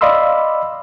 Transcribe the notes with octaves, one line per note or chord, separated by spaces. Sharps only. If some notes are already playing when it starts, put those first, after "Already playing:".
D5 D#5 F5 B5 C6 E6